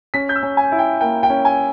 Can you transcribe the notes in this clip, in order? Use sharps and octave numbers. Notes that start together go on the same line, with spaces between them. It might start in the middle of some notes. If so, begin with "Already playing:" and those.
C#4 B6
G6
E6
C#4
G#5
E4
G5
A#3 G5
G5
C#4
G#5